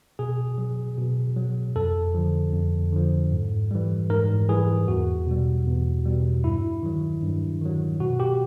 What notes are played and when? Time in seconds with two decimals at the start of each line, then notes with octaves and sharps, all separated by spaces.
0.19 B2 G#4
0.58 F#3
0.98 B2
1.36 F#3
1.76 F2 A4
2.14 D3 F3
2.53 F2
2.92 D3 F3
3.32 G#2
3.71 E3 G3
4.10 G#2 A#4
4.48 E3 G3 G#4
4.88 E2 F#4
5.27 B2 G3
5.66 E2
6.05 B2 G3
6.44 G2 E4
6.83 D#3 F#3
7.23 G2
7.61 D#3 F#3
8.00 B2 F#4
8.20 G4